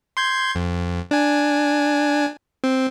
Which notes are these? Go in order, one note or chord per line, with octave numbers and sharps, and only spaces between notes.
C6 G6 G#6
F2
D4 G#5
C4